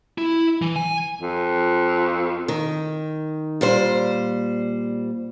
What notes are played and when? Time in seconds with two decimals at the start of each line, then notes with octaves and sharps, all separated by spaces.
0.18 E4
0.62 E3
0.76 G#5
1.21 F2
2.48 D#3
3.61 A#2 G3 C5